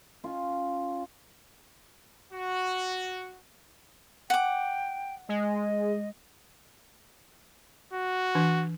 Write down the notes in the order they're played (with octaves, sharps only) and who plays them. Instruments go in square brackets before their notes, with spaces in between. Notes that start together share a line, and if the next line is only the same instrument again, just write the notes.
[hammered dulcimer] C#4 F4
[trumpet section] F#4
[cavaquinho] F#5 D6 [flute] G5
[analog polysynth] G#3 [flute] D#5
[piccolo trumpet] F#4
[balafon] E3 D4